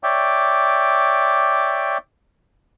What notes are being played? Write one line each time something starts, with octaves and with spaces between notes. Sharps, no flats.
C#5 D5 E5 G5 D6